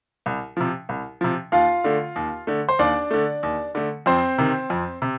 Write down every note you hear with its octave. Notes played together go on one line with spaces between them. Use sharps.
C2
C3 F3
C2
C3 F3
D#2 F4 F5
D3 A3
D#2
D3 A3
C5
D#2 D4 D5
D3 A3
D#2
D3 A3
F2 C4 C5
C3 D#3
F2
C3